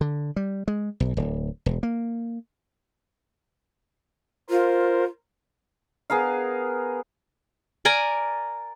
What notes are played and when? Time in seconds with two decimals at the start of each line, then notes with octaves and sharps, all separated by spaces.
0.01 D3
0.36 G3
0.68 G#3
1.00 B1
1.17 D1
1.66 E1
1.83 A#3
4.50 F4 A#4 C5
6.10 B3 G#4 A#4 F5
7.85 A#4 D5 G#5 A#5